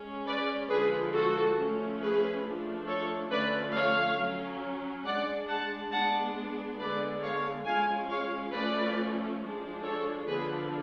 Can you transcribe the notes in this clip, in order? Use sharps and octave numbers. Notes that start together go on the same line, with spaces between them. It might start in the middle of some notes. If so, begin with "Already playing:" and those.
Already playing: G#3 C#4
B4 D5
D3 F3 G#3 G#4 B4
F#4 A4
F3 A3 C#4
G#4 B4
F3 A3 D4
A4 C#5
D3 F3 A3 C#4 B4 D5
C#5 F5
F#3 C#4
G#3 D4 D5 F#5
F#5 A5
G#3 B3 D4 F#5 A5
D3 G#3 B3 B4 D5
C#5 F5
F3 G#3 C#4 F5 G#5
C#5 F5
F3 A3 C#4 B4 D5
F3 G#3 D4
A4 C#5
D3 F3 B3 D4 G#4 B4